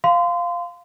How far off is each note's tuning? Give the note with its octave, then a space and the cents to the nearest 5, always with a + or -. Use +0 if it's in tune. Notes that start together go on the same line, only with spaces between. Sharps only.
F5 +0 C6 -30